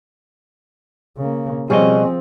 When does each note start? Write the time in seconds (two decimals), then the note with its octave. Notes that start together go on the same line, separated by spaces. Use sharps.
1.17 C#3 A#3
1.70 B2 F3 G3 C4 G#4 C5 C#5 D#5